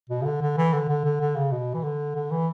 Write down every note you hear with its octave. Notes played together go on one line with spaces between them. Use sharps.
B2
C#3
D3
D3
E3
D3
D3
D3
D3
C#3
B2
E3
D3
D3
E3